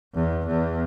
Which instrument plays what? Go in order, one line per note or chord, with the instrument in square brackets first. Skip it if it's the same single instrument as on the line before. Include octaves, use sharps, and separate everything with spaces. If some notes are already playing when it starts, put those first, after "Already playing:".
[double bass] E2
E2